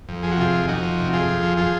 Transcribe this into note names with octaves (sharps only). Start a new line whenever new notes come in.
F2
F3 G#4
F#4
C3 F4 G#4
F2
F2 D#4 F#4
F3
C3
F2 F4 G#4
F2
F3
F3 F4 G#4